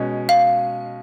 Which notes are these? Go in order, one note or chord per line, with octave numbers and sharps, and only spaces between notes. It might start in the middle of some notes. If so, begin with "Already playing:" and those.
Already playing: B2 G#3 C#4
F5